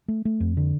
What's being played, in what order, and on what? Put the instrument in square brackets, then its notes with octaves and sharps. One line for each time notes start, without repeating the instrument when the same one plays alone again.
[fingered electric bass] A3
A3
F2
D3